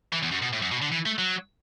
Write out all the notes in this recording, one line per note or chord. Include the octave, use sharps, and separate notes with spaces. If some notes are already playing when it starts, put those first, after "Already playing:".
E3
E2
F#2
B2
A2
F#2
B2
D3
E3
A3
F#3